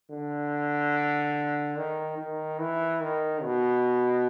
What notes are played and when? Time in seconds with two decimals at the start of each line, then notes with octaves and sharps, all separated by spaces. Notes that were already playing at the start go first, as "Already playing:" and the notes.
0.10 D3
1.77 D#3
2.18 D#3
2.60 E3
3.01 D#3
3.43 B2